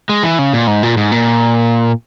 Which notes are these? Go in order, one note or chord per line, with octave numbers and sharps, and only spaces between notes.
G#3
E3
C#3
A#2
G#2
A#2
G#2
A#2